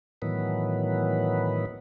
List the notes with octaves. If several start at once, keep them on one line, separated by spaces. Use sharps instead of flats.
A2 D#3 E3 F#3 B3